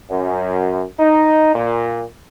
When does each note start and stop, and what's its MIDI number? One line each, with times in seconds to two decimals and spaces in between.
0.10 0.82 42
0.99 1.52 63
1.54 2.02 46